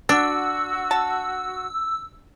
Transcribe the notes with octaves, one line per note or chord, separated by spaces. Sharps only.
D4 F#4 E6
A5